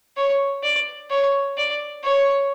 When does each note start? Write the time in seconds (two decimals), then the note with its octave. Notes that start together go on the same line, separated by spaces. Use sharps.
0.17 C#5
0.63 D5
1.10 C#5
1.57 D5
2.04 C#5